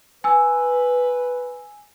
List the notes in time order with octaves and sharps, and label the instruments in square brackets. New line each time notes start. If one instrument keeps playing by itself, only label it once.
[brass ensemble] B4 [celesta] G#5 E6